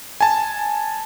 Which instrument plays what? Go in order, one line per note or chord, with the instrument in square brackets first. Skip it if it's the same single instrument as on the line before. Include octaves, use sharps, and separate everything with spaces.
[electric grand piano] G#5 A5